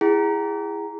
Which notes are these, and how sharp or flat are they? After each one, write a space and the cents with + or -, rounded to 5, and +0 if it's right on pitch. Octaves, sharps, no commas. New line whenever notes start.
E4 +20 G#4 -15 F#5 +45